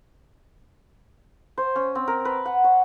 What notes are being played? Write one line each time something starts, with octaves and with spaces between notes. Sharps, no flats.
C5
C#4
C4
A#4
B4
F#5
C#5